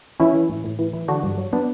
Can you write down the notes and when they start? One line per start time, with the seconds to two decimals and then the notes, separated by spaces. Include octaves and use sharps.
0.20 E3 C#4 E4
0.34 E3
0.49 A2
0.64 A2
0.79 E3
0.93 E3
1.08 D3 D4 F#4
1.23 G2
1.38 F#3
1.53 B3 D4